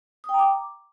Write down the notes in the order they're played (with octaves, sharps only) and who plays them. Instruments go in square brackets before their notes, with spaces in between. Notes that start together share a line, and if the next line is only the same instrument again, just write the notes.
[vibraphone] D#6
G5
A#5
D6